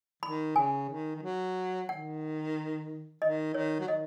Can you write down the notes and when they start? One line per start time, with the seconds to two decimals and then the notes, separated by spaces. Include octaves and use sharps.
0.23 D#3 B5
0.56 C#3 G#5
0.89 D#3
1.16 D#3
1.22 F#3
1.89 D#3 F#5
3.22 D#3 D#5
3.54 D#3 C#5
3.80 F#3
3.88 D#3 D#5